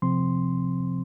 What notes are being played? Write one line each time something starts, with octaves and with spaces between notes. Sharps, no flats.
C3 F3 C4 C6